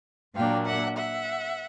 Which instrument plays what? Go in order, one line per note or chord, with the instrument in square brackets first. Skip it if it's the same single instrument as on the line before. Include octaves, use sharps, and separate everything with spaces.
[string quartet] A#2 F#3 A#3 D4 F5 G5
E5 F#5
E5 F#5